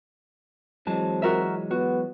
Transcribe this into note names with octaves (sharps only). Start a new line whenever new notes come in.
E3 F#3 G#3 C4 A5
F#4 A#4 E5
B3 F#4